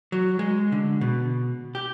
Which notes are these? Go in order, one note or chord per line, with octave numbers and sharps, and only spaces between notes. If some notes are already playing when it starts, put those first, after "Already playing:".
F#3
G#3
D3
B2
G4